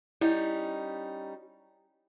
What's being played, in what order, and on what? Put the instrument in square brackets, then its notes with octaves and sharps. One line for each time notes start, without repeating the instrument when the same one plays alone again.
[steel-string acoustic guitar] G3 C#4 D#4 [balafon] E4